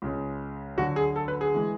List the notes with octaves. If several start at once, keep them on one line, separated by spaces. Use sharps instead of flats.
C#2 C#3 G#3
D2 D3 F#3 F#4
G#4
A4
B4
G#4
E3 G#3